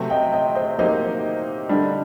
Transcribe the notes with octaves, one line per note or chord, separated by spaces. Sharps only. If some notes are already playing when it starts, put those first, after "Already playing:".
Already playing: C3 F#3 A3 C4
D#5 G5
D#5 G5
C5 D#5
F#3 A#3 D#4 G4 C5 D#5
D3 G3 D4